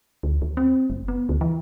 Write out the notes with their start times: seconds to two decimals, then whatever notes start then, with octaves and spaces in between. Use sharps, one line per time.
0.23 D2
0.42 D#2
0.57 C4
0.90 F#1
1.08 B3
1.29 D2
1.41 E3